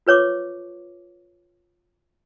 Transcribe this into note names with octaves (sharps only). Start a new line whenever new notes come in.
F4 B4 C#5 C#6 D6